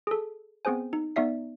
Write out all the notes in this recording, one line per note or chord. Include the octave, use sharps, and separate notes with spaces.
G#4 A4
B3 C4 G#4 C5 G#5
D#4
B3 D#4 D5 E5 C7